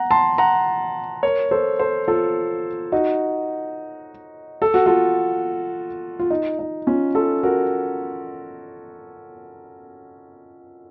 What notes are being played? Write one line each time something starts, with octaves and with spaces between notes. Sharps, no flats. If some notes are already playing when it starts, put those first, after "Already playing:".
Already playing: F#5 A#5
A5 C6
F#5 A#5
A#4 C#5
A4 C5
A4 C5
F4 A4
D#4 F#4
A4
F#4
F4 A4
F4
D#4
D#4
C#4 F4
F4 A4
F#4 A#4